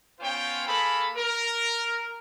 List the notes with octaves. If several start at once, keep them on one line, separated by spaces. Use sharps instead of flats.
B3 C#4 F4 C5 C#5 G5
A#3 G#4 A4 B5
A#4